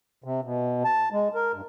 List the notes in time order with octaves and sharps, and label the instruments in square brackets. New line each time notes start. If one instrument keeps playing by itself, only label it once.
[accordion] C3
B2
A5
G#3
A#4
G2